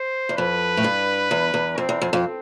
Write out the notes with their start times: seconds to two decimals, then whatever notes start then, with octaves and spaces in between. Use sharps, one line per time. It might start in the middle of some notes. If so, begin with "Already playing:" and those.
Already playing: C5
0.29 E2
0.37 F2 B4
0.77 A2
0.84 G2
1.31 E2
1.54 E2
1.78 F2 C4
1.89 E2
2.01 F2
2.13 F2